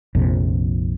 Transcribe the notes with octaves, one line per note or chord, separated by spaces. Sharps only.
A#1 F2 C3